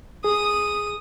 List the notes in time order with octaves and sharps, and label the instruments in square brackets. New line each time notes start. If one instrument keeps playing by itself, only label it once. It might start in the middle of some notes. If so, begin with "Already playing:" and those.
[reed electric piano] G#4 [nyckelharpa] D#6